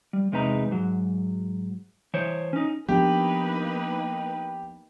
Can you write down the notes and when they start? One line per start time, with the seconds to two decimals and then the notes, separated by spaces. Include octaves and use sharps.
0.13 G3
0.32 E2 C3 G#3 D#4 B4 A#5
0.71 G#2 F#3
2.14 E3 C5 C#5
2.53 C#4 D#4
2.89 F3 A#3 B3 D4 D#4 G4 B4